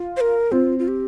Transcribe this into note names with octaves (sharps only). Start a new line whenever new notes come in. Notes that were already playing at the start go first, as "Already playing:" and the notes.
Already playing: F4
C5
A#4
C4 F4
F4
G4